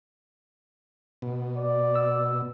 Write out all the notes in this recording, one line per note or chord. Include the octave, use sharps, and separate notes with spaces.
B2
D5
E6